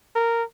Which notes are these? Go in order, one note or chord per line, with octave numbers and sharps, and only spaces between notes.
A#4